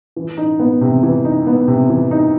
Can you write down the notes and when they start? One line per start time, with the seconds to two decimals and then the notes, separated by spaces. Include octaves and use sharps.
0.16 E3
0.37 D#4
0.60 B3
0.81 C3
1.03 E3
1.25 D#4
1.47 B3
1.68 C3
1.89 E3
2.11 D#4